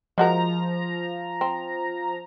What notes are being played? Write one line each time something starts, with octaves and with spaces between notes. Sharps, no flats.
F3 G#3 F#4 A#4 A#5
C4